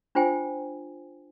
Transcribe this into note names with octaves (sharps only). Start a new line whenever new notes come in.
D4 F4 C5 G5 G#5